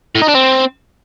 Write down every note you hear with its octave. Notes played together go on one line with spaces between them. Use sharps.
A2
D#4
D4
C4